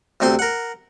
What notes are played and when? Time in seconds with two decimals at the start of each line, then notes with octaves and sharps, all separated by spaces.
0.20 D2 C3 C4 C5 C6
0.39 A#4 F#5